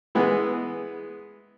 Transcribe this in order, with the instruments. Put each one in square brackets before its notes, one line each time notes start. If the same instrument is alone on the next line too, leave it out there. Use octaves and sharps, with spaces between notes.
[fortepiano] E3 G#3 B3